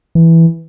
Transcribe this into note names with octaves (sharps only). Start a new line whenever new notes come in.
E3